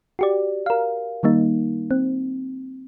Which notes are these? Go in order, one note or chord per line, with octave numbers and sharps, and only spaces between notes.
F#4 G4 D5
A#4 F5
D#3 G3 A#3 D#4
C4